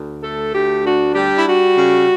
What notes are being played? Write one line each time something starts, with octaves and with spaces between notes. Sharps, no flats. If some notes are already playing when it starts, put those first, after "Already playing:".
Already playing: D2
A3 A4
D2 G4
D4 F#4
G3 G4
E4
G3 F#4
C#3